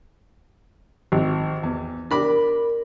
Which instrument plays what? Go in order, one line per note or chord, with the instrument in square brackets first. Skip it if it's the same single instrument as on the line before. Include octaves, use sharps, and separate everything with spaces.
[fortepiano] G#1
E2
[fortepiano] D4 B5 D6 [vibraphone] A#4